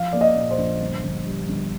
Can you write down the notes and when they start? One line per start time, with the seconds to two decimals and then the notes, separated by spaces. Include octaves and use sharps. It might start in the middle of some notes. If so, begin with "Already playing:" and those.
Already playing: F3 F5
0.13 A#3 D5
0.21 D#5
0.35 A#2
0.51 C5
0.58 A#1
0.81 G1
1.03 G1
1.26 G3
1.49 G1